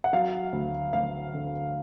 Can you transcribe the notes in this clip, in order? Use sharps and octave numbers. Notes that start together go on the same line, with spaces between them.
F#5
F#3 F5
D2
D2 F5
D3